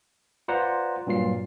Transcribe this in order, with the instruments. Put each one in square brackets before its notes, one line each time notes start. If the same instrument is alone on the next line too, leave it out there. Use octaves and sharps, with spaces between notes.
[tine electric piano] F4 B4 C5 D5 F#5 A#5
G2 A#2 F#3 F4 C7